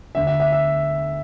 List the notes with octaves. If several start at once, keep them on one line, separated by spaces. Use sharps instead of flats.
D2 D3 E5
E5
E5
E5